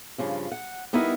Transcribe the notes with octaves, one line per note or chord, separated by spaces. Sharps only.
G2 C#3 F3
F#5
G3 B3 D#4 E4 A#4